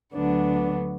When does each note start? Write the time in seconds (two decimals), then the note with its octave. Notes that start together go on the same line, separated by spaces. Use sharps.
0.14 D2 D3 F#3 B3 D4